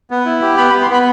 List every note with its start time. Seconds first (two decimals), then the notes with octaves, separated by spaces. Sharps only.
0.11 B3
0.25 E4
0.42 G4
0.57 B3 B5
0.69 B5
0.73 B3
0.82 C6
0.90 B3 B5